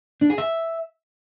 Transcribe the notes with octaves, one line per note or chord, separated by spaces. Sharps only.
D4
G#4
E5